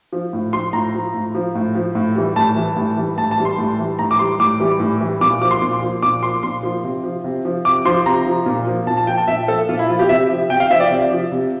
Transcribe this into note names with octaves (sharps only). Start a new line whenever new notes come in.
F3
A2
F3 C6
A2 A#5
F3
A2
F3
A2
F3
A2
E3 G3
A2 A5
E3 G3
A2
E3 G3
A2 A5
A5
E3 G3
C6
A2
E3 G3
A2 A#5
D6
E3 G3 C6
A2 D6
E3 G3
A2
E3 G3
A#2 D6
F3 D6
C6
A#2
F3
A#2 D6
F3 C6
A#2 C6
F3
C3
F3
C3
F3
C3 D6
F3 C6
C3 A#5
F3
A#2
F3
A#2 A5
A5
F3 G5
A5
A#2 E5
F3 A4
A#2 F4
E4
F3 F4
G4
C3 E5
F3
C3 G5
F5
F3 E5
D5
C3
F3
C3